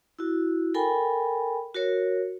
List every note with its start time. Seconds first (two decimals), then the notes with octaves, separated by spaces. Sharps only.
0.19 E4 F#4
0.74 A4 A#4 G5 G#5 B5
1.75 F#4 A#4 C#5